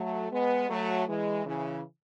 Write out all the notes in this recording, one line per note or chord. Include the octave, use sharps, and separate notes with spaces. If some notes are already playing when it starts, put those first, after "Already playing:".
Already playing: F#3 A3
G#3 B3
F#3 A3
E3 G#3
C#3 E3